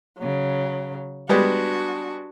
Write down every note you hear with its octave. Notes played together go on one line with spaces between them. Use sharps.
C#3 F#3
G3 G#3 B3 D4 F#4